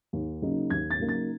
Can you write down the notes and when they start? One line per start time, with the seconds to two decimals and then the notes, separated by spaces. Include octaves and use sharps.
0.13 D#2
0.42 C#3 F#3 A#3 D#4
0.70 D#2 G#6
0.91 A6
0.99 C#3 F#3 A#3 D#4
1.09 A6